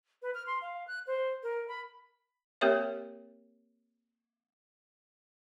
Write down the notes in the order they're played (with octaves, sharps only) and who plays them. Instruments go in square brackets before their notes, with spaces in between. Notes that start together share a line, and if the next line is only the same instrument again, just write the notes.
[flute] B4
F6
C6
F5
F#6
C5
A#4
B5
[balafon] A#3 C4 G4 A#4 C#5 E5